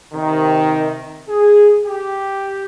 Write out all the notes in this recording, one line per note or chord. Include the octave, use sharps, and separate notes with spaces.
C3 D#3
G#4
G4